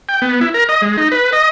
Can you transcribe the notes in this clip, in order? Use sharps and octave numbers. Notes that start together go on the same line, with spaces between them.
G5
B3
E4
A#4
D#5
G#3
D#4
B4
D#5